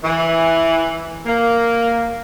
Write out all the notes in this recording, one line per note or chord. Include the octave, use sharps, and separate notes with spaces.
E3
A#3